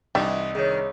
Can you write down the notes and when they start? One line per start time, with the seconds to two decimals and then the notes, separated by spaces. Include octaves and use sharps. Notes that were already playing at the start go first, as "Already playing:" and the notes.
0.15 C2 E3 G3 D4 D#4 D#5 E5
0.55 D#3 G#4 C#5